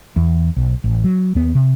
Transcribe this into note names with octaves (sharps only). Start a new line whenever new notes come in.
E2
B1
A1
F#3
D#2 B3
C3